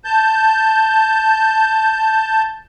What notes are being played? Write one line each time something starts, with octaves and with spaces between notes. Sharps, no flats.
A5 G6